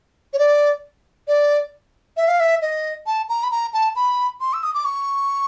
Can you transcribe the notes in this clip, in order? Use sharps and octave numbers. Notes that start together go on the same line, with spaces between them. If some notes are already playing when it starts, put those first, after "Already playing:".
C#5
D5
D5
E5
F5
E5
D#5
A5
A#5
B5
A#5
A5
B5
C6
E6
D#6
D6
C#6